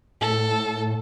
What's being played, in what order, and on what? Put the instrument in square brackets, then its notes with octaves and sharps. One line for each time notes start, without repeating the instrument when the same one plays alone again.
[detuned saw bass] A2 [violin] A4